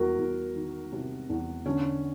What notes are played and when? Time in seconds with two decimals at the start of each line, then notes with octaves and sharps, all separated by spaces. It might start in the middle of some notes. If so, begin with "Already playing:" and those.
Already playing: E2 F#4 A#4
0.18 E2
0.55 D#3
0.93 C3
1.30 E2
1.65 D3 C#4